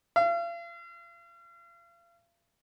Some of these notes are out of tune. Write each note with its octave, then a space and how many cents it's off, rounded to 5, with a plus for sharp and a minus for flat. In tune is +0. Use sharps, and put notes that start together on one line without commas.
F5 -40